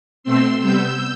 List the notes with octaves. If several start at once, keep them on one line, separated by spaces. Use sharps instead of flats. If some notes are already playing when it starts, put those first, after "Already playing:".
B2 A3 C4 C6 E6
C3 G3 B3 E6 G6